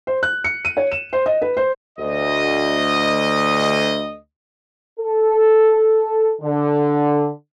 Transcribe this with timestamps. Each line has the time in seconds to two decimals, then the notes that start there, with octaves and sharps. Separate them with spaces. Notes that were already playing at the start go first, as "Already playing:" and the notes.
0.07 C5
0.23 F#6
0.44 C#7
0.65 D#7
0.77 C#5
0.92 E7
1.13 C5
1.26 D#5
1.42 B4
1.57 C5
1.99 D2 D#5
4.99 A4
6.41 D3